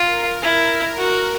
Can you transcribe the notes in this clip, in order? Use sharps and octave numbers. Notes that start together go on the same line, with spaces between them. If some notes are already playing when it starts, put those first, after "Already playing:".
Already playing: F4 A#4
E4 A#4
F#4